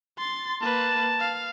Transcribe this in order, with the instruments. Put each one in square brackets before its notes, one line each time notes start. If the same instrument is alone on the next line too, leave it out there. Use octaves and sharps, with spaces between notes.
[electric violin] C6 A6
[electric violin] A#3 B4 [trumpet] A5
[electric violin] F5